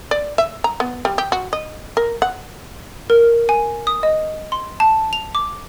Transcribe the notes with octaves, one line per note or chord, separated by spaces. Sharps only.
D5
E5
A#5
B3
G3
G4
F#4
D#5
A#4
F#5
A#4
G#5
D#6
D#5
C6
A5
F7
D6